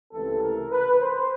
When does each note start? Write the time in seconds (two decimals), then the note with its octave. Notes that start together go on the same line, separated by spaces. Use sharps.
0.13 C#2 C3 E3 A3 C4 A4
0.41 A#4
0.70 B4
0.98 C5